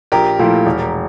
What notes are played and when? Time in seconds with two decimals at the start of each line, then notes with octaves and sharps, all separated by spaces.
0.12 A#1 G4 A#4
0.39 A#2 F3 A3 E4
0.66 E1